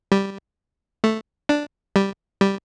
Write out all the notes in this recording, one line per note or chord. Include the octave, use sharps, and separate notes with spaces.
G3
A3
D4
G3
G3